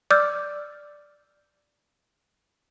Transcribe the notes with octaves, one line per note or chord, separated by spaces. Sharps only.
D5 D6 E6 F6 G6 A6